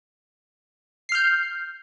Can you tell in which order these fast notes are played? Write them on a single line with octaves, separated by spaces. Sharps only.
C7 F6 G6